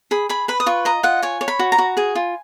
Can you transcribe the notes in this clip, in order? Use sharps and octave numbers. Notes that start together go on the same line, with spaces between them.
G#4 B5
G#4 B5
B4 B5
D#6
F4 C#6
D#5 A#5
F4 F#5
C#5 G#5
C#5
B5
F#4
A#5
F#4
G#4 G#5
F4